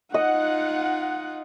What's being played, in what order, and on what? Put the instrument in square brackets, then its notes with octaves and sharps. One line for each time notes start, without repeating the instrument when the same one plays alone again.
[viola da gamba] D#4 F4 [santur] D#5 [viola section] F#5